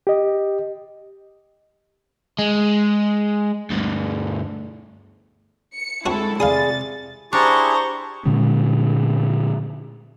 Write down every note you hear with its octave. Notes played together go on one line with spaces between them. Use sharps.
G4 D#5
G#3
D2 G2
C#7
G#3 C4 D4 E4 F#4 A4
C3 G#4 D5 F5 G#5 B5 D#6 A6
D4 E4 G4 G#4 C5 A#5 C#6
A#2 D3 G#3 C#4